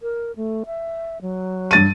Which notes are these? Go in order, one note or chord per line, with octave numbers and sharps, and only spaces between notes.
A#4
A3
E5
F#3
G2 A6 D#7